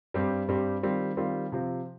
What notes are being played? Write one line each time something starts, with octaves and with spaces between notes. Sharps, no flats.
G2 G3 C4 G4
G2 G3 C4 G4
D#3 G3 C4 F4
D#3 G3 C4 F4
C3 F3 C4